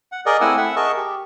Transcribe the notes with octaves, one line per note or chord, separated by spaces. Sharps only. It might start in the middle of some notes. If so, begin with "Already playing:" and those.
F#5
G#4 A#4 D5 D#5
A3 C4 E4 F#5 G#5 E6
E5 F#5 E6
G#4 A#4 D#5 A5 C#6
G4